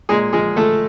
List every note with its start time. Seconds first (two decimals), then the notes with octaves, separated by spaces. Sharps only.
0.09 A#2 G#3 G#4
0.33 F3 G#3 G#4
0.56 F3 A3 A4